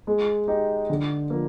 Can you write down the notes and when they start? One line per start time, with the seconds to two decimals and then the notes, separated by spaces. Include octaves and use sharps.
0.07 G#3
0.48 D#4 G4
0.90 D3
1.30 F3 A#3